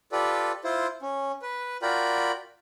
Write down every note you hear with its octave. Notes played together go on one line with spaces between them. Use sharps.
F4 G4 A4 B4 D5
E4 F4 C5
C#4
B4
F4 F#4 A#4 D5 G5 B5